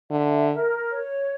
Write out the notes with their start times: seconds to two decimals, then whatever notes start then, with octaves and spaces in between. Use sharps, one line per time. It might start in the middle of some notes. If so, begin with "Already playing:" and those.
0.11 D3 E5
0.51 A#4
0.90 C#5